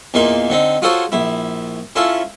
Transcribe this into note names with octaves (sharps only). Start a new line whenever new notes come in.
E2 A#2 A#3 D#4 C6
D3 C4 D#4
F4 F#4 G#4 A4 C5 C#5
A#1 E4
C#4 E4 F4 A4